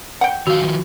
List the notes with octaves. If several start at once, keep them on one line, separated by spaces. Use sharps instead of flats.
F#5 G5
D#3 F3 F#4 F5
D#3 F3